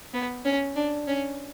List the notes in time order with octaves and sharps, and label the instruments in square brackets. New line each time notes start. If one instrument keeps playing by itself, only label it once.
[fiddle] B3
C#4
D4
C#4